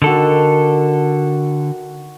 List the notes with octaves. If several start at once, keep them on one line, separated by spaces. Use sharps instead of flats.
D3 D#3 F#4 A4